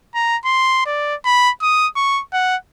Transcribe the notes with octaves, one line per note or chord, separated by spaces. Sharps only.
A#5
C6
D5
B5
D#6
C#6
F#5